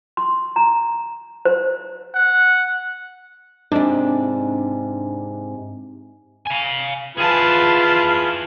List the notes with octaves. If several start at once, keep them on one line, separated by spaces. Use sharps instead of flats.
C6
A#5
C5
F#5
G#2 C3 C4 D4 G#5
F5 G#5
E4 F4 G#4 B4 A5